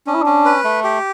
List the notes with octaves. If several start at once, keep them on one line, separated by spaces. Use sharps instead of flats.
C#4 D4
E4
C#4 D4
B4
A3
G4